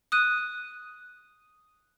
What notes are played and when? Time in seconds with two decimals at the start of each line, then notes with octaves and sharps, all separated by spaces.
0.12 D#6 F#6 D#7